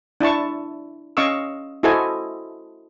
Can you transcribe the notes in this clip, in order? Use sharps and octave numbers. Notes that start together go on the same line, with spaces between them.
D4 E4 A5 C#6
C#4 D#5 F5 C#6 D6 E6
E4 F#4 A4 C5 D#5 G#5